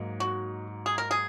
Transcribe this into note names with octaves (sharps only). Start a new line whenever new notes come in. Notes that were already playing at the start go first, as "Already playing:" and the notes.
Already playing: G#2 F#3 A#3 D#4
F#4
G#4
A#4
G#4